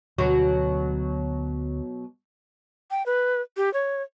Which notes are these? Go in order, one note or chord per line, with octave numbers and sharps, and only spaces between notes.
D2 B2 F#3 D4 F#4
G5
B4
G4
C#5